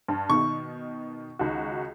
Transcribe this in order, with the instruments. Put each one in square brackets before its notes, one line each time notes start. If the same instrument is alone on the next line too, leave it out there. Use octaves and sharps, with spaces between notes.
[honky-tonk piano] G2
[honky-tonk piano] B2 D#3 [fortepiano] C#6
[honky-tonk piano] C#2 D#3 F#4